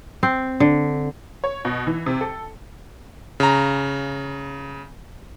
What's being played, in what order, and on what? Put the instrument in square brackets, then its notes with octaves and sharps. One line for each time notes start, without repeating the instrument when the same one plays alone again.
[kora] C4
D3
[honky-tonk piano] C#5
B2
E3
C3
A4
[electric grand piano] C#3 A#5